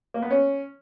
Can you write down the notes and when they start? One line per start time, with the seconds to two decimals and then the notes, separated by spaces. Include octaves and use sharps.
0.14 A#3
0.22 B3
0.31 C#4